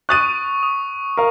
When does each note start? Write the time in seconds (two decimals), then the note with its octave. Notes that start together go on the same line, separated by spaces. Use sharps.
0.09 C#6 D#6 F#6 A6 D#7
0.63 D#6
1.17 A#4 F5